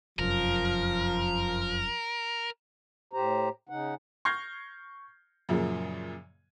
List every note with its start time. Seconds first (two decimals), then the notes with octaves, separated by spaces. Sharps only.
0.19 F1 F#2 F3 A#4
3.13 A2 G4 C5 A#5
3.69 C#3 D#4 F#5
4.25 C#6 F6 G6 G#6 A#6 C7
5.49 F#2 A#2 C#3 F3